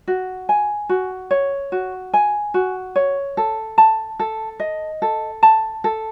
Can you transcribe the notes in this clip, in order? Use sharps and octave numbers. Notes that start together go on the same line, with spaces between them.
F#4
G#5
F#4
C#5
F#4
G#5
F#4
C#5
A4
A5
A4
D#5
A4
A5
A4